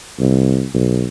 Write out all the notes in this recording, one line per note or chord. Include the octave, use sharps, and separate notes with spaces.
C2
B1